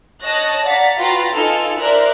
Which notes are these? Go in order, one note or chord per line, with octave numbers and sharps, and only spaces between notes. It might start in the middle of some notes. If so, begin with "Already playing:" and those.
C#5 D#5 A5 F#6 A#6
D5 F5 F#5 A#5 A6 B6
F4 F#4 B4 G5 A#5 A6
D#4 F4 A4 G#5 F6
A#4 C5 D5 E5 F#6